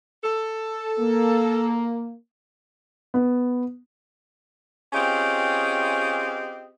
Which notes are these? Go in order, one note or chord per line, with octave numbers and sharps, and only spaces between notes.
A4
A#3
B3
C4 C#4 F4 G4 G#4 D#5